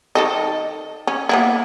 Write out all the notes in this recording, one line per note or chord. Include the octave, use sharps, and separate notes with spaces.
D#3 A4 D#5
C#4
A#3 B3 E4